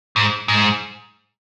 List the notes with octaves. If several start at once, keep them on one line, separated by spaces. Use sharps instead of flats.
G#2
G#2